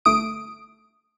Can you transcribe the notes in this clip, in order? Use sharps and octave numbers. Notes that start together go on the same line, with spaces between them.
G1 A3 D#6 D7